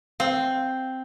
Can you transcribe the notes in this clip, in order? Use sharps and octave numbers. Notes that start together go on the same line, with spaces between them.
C4 F5